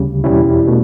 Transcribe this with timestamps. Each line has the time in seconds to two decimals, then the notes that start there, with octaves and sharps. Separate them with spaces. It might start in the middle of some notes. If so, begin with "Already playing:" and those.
Already playing: D2 C#3 G3
0.24 E2 B2 G3 C#4 E4
0.67 B2 A3